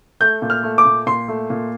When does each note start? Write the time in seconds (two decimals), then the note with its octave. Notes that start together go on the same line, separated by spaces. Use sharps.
0.20 A3 G6
0.42 A#2
0.50 F6
0.63 A3
0.78 D6
0.85 A#2
1.07 A#2 C6
1.28 A3
1.50 A#2